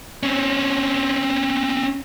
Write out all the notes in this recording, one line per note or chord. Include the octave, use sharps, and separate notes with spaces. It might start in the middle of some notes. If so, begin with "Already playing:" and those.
C4 C#4